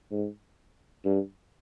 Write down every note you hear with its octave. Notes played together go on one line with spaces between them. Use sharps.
G#2
G2